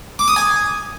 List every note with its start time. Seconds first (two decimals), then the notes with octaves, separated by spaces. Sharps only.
0.19 D6
0.28 D#6
0.36 G#5